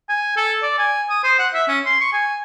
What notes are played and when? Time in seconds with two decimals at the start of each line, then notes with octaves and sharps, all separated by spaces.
0.09 G#5
0.37 A4
0.63 D5
0.79 G#5
1.10 D#6
1.24 C5
1.39 F#5
1.54 E5
1.68 C#4
1.86 C6
2.01 C#6
2.13 G#5